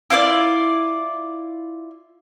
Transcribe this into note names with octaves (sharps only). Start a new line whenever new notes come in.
E4 F4 C5 D5